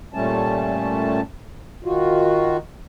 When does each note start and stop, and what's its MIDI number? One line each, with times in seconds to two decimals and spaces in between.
0.14 1.21 46
0.14 1.21 55
0.14 1.21 57
0.14 1.21 61
0.14 1.21 81
1.84 2.57 51
1.84 2.57 65
1.84 2.57 66